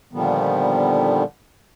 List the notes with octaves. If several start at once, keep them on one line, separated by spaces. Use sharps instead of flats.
A#2 D3 D#3 F3 G3 B3